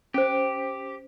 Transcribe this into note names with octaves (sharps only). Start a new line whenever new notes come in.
C#4 G4 C5